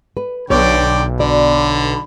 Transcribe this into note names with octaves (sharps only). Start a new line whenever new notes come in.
B4
B1 D3 B4 C#5 D5 G5
D3 D5 B5